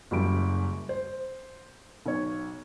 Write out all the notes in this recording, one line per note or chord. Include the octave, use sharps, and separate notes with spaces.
F#1 F#2 G3 D7
C5
B1 C#5